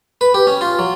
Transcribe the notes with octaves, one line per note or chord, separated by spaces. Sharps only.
B4
G4
C#4
F4
F#3